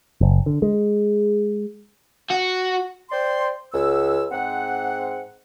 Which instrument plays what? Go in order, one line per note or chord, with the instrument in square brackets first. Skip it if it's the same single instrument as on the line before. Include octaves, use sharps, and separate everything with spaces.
[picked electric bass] F#1
D3
G#3
[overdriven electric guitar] F#4
[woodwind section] C5 D5 G5 C6
C#2 E6
G#2 C4 F#5